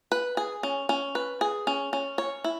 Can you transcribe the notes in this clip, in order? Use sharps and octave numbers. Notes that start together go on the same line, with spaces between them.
B4
G#4
C#4
C#4
B4
G#4
C#4
C#4
C#5
E4